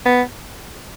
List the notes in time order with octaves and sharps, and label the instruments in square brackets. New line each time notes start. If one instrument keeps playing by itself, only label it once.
[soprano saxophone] B3